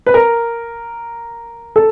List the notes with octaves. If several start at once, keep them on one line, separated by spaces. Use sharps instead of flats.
B4
A#4
A4